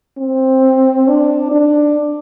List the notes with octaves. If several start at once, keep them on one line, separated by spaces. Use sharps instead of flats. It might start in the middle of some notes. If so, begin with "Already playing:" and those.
C4
D4
D4